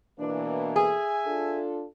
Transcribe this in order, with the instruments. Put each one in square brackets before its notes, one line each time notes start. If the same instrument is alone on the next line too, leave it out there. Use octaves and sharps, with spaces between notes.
[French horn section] B2 E3 A#3 [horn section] D4
[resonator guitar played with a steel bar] G#4 [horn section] E5 G#5
[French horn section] D4 F4 A4